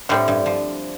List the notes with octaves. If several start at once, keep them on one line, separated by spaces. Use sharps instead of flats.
A2 D3 G3 C4
G2
F3